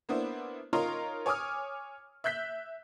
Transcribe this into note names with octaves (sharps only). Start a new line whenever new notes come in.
A#3 B3 D4 E4 C5
D#4 F4 A#4 C#5 A#5 C6
C#5 G#5 D6 D#6 F6
E5 F#6 G6 B6